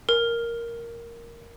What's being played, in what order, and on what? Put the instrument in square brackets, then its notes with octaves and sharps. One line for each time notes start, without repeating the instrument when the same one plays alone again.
[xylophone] A#4